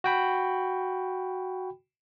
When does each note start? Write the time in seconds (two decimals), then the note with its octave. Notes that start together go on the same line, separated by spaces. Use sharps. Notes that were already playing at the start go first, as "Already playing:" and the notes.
0.04 F#4 G5 B5